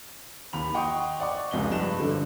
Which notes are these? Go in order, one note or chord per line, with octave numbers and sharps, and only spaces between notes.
D#2 B5 F7
D#5 F#5 G5 C6 C#6 D#6
D5 F#5 C#6
F1 C#2 B3 D#5 G7
G2 B4 E7
D3 F3